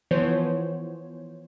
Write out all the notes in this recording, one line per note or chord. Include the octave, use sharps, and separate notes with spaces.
E3 F3 B3 C5 C#5